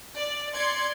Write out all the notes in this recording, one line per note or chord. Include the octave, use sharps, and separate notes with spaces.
D5
D5 C6 G#6 C#7